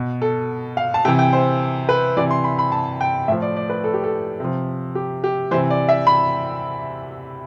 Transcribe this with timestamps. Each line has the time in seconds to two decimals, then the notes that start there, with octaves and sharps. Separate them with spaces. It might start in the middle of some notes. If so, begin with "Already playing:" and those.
Already playing: B2
0.22 A4
0.77 F5
0.94 A5
1.05 C3 G5
1.08 E3
1.19 G5
1.33 C5
1.89 B4
2.17 C3 E3 D5
2.31 C6
2.44 B5
2.59 B5
2.72 A5
3.01 G5
3.28 A2 F3 E5
3.42 D5
3.56 D5
3.70 B4
3.84 A4
3.94 G4
4.04 A4
4.40 C3 F3
4.95 G4
5.24 G4
5.51 E3 C5
5.54 C3
5.70 D5
5.89 E5
6.07 B5